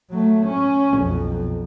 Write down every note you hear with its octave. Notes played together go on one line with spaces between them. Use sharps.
F#3 A3
C#4
B1 F2